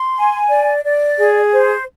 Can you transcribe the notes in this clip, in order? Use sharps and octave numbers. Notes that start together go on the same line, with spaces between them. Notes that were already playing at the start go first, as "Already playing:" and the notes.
Already playing: C6
G#5
D5
D5
G#4
C5